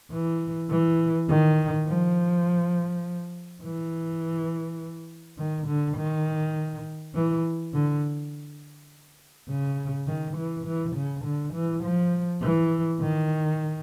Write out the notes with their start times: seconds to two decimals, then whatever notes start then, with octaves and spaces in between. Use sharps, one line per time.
0.12 E3
0.70 E3
1.29 D#3
1.87 F3
3.63 E3
5.38 D#3
5.67 D3
5.97 D#3
7.15 E3
7.73 D3
9.49 C#3
10.07 D#3
10.36 E3
10.66 E3
10.96 C#3
11.24 D3
11.53 E3
11.83 F3
12.41 E3
13.00 D#3